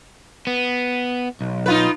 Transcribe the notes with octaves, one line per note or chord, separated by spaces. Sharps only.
B3
B1
D#4 F4 B4